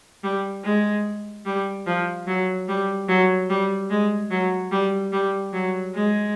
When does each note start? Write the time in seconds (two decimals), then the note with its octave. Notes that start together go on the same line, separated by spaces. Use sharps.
0.23 G3
0.64 G#3
1.46 G3
1.86 F3
2.27 F#3
2.68 G3
3.08 F#3
3.50 G3
3.90 G#3
4.31 F#3
4.72 G3
5.12 G3
5.53 F#3
5.95 G#3